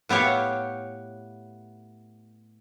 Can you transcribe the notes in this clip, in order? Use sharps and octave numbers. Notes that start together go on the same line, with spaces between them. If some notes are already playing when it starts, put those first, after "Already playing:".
A2 B3 G4 C#5 F5